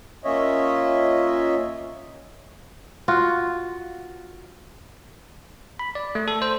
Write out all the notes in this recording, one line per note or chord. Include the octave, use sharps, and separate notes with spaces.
A#3 C#4 F4 C#5 D#5 E5
F4 F#4
B5
D5
A3
A4
C5